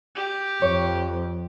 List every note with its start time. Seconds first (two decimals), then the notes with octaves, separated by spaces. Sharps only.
0.15 G4
0.62 F2 C#5